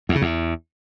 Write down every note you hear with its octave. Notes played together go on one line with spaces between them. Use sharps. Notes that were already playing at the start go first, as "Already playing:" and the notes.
E2
C#3
E2